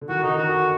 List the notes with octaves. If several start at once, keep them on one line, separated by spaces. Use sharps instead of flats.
D3
D#3 F#4
D3 D#4
D#3 F#4